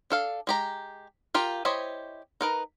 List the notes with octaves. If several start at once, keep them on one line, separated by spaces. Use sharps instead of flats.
D4 A4 F5
G#3 G4 A#5
F4 G4 A#4
E4 G4 C5 C#5 D#5
D#4 A#4 B4